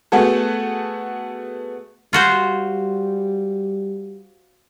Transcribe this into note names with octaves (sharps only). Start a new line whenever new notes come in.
A3 B3 F#4 G#4 A4
G3 F4 F#4 C5